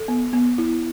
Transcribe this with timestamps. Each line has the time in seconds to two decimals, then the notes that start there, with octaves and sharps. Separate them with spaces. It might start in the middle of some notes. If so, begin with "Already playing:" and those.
Already playing: A4
0.08 B3
0.33 B3
0.58 E4